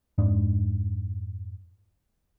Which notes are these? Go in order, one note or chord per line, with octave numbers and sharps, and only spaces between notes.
F2 G#2 G#3 D4